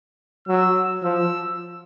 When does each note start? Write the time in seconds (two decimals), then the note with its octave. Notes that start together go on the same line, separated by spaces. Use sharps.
0.47 F#3 E6
1.03 F3 E6